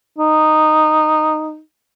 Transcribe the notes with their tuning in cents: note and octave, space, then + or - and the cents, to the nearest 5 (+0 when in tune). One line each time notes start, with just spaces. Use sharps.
D#4 -10